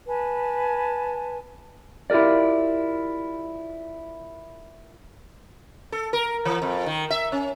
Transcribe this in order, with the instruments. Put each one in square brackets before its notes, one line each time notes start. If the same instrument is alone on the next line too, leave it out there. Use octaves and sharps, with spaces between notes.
[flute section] B4 G#5 A5
[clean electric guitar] E4 F4 G4 A#4 D5
[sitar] A4
A#4
E3
F2
D#3
E5
C#4